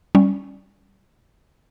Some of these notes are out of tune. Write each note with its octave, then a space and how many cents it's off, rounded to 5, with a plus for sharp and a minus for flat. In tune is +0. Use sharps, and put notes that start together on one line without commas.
G3 +0 C#4 +0